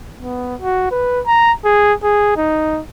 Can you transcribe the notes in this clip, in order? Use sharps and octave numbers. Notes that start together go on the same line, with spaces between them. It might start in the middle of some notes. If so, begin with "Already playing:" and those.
B3
F#4
B4
A#5
G#4
G#4
D#4